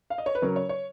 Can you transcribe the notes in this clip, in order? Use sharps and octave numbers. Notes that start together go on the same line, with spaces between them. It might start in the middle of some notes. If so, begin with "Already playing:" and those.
F5
D#5
C#5
B4
C#3 F#3 C#4 A#4
C#5
C#5